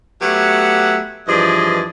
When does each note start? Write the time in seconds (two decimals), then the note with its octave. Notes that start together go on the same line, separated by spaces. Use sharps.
0.22 F#3 A3 B3 G4 E5 F#5
1.28 G2 E3 F3 G#4 D5 D#5